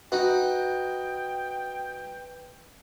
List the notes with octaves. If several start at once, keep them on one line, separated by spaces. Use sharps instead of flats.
D#4 F#4 B4 G5